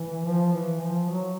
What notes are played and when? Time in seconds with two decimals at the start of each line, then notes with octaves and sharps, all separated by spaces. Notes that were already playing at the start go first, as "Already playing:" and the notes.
Already playing: E3
0.25 F3
0.53 E3
0.81 F3
1.09 F#3